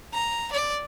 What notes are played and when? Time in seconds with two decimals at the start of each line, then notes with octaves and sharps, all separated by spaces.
0.13 A#5
0.52 D5